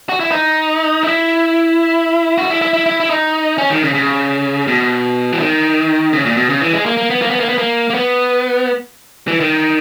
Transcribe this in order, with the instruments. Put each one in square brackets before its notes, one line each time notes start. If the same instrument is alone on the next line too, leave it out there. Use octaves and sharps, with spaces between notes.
[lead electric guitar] F#4
E4
D#4
E4
F#4
E4
E4
E4
E4
E4
D#4
C#4
D#3
C#3
C#3
B2
E3
D#3
C#3
A#2
B2
C#3
E3
G#3
A#3
A#3
B3
A#3
B3
A#3
B3
A#3
A#3
B3
E3
D#3